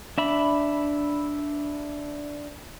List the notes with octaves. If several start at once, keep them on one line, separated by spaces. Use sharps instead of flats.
D4 E5 B5